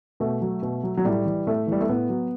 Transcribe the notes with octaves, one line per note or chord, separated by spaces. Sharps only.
B2 A3
F#3
B2
F#3
F#3
A2 G3
E3
A2 A3
E3 G3
A3
A2 B3
F#3